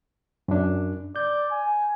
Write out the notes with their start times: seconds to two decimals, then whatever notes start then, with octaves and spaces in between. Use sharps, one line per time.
0.48 F#2 D4
1.16 D5 G6
1.51 G#5